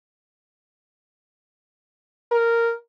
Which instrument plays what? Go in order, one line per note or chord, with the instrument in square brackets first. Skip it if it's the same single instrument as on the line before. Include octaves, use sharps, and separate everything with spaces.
[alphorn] A#4